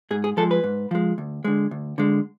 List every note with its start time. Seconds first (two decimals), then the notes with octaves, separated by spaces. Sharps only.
0.11 G#2 G#4
0.24 G#4
0.37 F3 G#3 A4
0.51 B4
0.64 G#2
0.91 F3 G#3
1.18 D2
1.44 D3 G#3
1.71 D2
1.98 D3 G#3